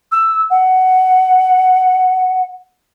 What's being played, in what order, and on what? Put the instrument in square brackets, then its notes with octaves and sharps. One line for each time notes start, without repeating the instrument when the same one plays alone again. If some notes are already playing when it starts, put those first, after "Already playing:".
[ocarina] E6
F#5